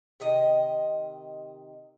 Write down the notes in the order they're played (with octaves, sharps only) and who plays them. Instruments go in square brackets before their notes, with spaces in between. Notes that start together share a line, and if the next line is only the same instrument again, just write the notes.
[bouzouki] C3 D#3 D#5